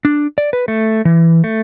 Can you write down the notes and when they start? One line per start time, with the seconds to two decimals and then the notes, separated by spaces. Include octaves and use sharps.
0.05 D4
0.38 D5
0.53 B4
0.68 A3
1.05 E3
1.44 A3